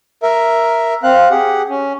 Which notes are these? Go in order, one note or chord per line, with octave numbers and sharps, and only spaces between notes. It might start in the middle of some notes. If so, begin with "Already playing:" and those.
A#4 E5
C4 F5 F#6
G4 G#4 F#5
C#4